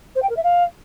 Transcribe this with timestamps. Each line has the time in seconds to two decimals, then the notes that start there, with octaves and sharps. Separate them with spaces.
0.15 C5
0.22 G5
0.29 A#4
0.36 E5
0.43 F5